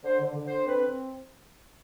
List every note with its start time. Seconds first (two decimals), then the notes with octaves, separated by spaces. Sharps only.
0.03 D3 C5
0.20 D3
0.35 D3
0.46 D3 C5
0.66 C4 B4
0.82 C4